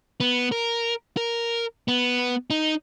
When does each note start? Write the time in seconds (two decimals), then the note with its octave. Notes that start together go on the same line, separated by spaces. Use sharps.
0.20 B3
0.52 A#4
1.17 A#4
1.88 B3
2.50 D#4